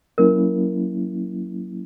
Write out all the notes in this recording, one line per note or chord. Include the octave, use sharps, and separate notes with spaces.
F#3 A#3 C#4 E4 A#4